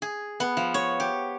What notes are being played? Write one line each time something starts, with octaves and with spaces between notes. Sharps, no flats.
G#4
B3
F3
C#5
G4